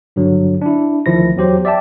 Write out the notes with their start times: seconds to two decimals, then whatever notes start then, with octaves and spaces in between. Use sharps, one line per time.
0.16 G2 D3 F#3
0.62 D4 E4
1.06 D2 D#3 F3 E4 A#6
1.36 E2 F#3 G4 C5
1.65 D5 E5 G5 A5